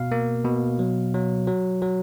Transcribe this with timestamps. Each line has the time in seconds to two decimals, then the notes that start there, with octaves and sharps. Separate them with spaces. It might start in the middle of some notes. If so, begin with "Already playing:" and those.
Already playing: B2 F5
0.12 A#3
0.45 B2
0.79 F#3
1.14 F#3
1.47 F#3
1.82 F#3